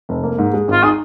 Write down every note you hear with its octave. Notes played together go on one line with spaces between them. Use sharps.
F1
A#3
G#2
G#3
G#1 F4
D#4 G#4